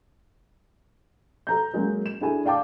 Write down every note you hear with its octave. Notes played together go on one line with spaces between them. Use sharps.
A4 A#5 G6
F#3 G#3 A#3 C#4
E7
D4 E4 G#4 A4 G#5
D5 F5 G5 A5 D6